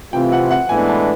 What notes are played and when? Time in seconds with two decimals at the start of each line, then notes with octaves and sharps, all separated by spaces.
0.13 C3 E3 A3 C4 F4 G5
0.32 F#5
0.51 F#5
0.69 A2 E3 G#3 B3 D4 G#5
0.88 A5